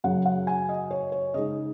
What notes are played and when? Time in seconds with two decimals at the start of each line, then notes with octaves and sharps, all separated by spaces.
0.04 F#2 C#3 F#3 F#5
0.26 F#5
0.47 G#5
0.69 D#5
0.91 C#5
1.12 C#5
1.34 C#3 G#3 D#4 D#5